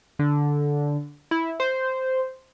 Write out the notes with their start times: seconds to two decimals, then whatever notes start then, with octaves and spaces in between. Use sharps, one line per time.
0.19 D3
1.31 E4
1.60 C5